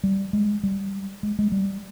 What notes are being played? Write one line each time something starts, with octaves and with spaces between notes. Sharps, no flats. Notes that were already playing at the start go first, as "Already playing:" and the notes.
G3
G#3
G3
G#3
G#3
G3